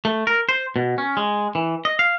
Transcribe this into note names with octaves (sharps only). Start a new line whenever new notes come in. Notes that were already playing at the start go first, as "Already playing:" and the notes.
A3
A#4
C5
B2
C#4
G#3
E3
D#5
F5